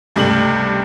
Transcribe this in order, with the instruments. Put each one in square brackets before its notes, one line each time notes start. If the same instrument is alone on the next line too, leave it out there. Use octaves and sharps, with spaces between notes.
[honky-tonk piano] C#2 G2 C3 A3 D4 F#7